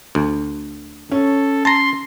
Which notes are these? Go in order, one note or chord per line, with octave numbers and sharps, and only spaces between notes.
D2
C#4 A4
A5 A#5 C6